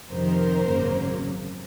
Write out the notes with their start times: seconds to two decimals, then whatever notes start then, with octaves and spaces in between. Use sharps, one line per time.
0.10 F2 C3 D#3 A#4 C5
0.67 G#1 F#2 C#3 F#3 A#3